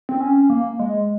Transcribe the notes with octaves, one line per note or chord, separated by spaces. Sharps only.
C4
C#4
A#3
G#3